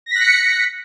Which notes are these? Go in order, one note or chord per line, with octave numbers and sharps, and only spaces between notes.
F#6 A#6 B6 C#7